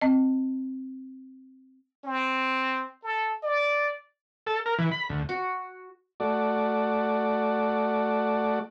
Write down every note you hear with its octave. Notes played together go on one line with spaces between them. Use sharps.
C4 D#5
C4
A4
D5
A4
A#4
E3
B5
D2
F#4
A3 F#4 D5